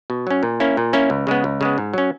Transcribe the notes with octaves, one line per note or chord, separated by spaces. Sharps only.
B2
F#3 C#4
A#2
A#3 C#4 E4
A#2
A#3 C#4 E4
C#2
C#3 G#3 B3
C#2
C#3 G#3 B3
G#2
F#3 C#4